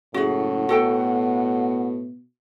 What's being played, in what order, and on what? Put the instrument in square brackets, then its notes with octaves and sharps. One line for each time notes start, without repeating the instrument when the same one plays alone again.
[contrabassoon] F#1 [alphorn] A2 [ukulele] F#4 G#4 [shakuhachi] F#5
[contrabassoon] B2 [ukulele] F#4 A4 G5